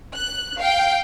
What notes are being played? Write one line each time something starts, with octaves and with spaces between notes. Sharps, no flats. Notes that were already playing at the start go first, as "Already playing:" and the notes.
F#6
F5 G5